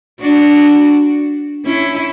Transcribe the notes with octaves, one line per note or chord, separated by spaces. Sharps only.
D4 F#4
C#4 E4